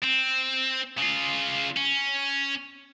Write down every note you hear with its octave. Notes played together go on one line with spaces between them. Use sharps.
C4
C#3 F4
C#4